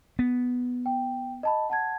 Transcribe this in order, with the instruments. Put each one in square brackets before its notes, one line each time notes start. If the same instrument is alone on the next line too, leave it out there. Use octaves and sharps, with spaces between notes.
[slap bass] B3
[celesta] G5
D#5 A5 B5
F#5 A5 G#6